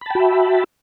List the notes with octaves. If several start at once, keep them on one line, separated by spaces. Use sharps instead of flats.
F#4 E5 G5 A5 B5